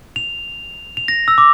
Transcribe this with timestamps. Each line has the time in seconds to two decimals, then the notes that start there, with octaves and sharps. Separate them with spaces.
0.16 F7
0.97 F7
1.08 A#6
1.28 E6
1.38 D6